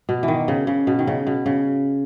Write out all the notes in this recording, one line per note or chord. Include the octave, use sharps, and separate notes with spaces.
B2
E3
D#3
C#3
C#3
B2
D#3
C#3
B2
C#3